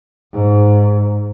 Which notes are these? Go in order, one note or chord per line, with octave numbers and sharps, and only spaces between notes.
G#2